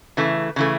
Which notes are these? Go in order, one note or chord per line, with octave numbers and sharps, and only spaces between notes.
C#3 E3 A3
C#3 E3 A3